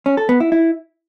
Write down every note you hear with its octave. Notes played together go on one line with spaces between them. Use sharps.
C#4
A4
B3
E4
E4